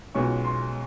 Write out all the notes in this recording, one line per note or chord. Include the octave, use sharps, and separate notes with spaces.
B1 B2 G#3 C#4 F4 C#6
C6